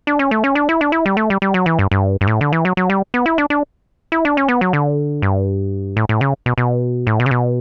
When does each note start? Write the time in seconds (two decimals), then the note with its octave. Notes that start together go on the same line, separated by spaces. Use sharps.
0.07 D4
0.19 C#4
0.31 A3
0.44 C#4
0.55 D4
0.69 E4
0.81 D4
0.92 E4
1.06 G3
1.17 A3
1.30 G3
1.42 G3
1.54 F#3
1.66 E3
1.79 G2
1.91 G2
2.21 G2
2.27 A2
2.41 D3
2.53 E3
2.65 F#3
2.77 F#3
2.90 G3
3.14 B3
3.26 E4
3.38 D4
3.50 D4
4.12 E4
4.25 D4
4.37 C#4
4.48 B3
4.61 F#3
4.73 D3
5.22 G2
5.97 A2
6.09 A2
6.21 C#3
6.46 B2
6.58 B2
7.07 A2
7.20 B2
7.26 C#3
7.31 B2